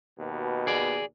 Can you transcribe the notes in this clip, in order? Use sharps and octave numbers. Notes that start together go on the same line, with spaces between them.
D#2 B2
G#4 D5